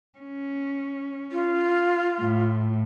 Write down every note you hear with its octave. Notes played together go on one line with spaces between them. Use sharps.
C#4
F4
A2